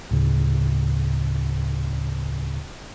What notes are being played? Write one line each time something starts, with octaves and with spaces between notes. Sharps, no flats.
D2 A2 C#3